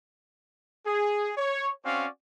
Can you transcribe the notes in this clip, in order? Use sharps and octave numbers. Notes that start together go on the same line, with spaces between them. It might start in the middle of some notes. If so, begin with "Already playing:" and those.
G#4
C#5
C4 C#4 F#4 D5 F5